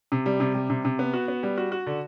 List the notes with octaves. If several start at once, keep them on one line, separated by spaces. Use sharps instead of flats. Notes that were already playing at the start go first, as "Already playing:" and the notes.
C3
G3
C3
G3
C3
C3
B3
F#4
B3
G3
F#4
F#4
D3